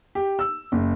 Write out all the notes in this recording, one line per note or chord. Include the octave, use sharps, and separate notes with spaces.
G4
E6
F#1